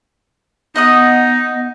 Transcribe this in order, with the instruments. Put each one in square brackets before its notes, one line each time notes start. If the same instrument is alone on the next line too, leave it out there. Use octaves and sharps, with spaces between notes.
[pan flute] B3 [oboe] D#4 [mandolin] D#5 F#5 D#6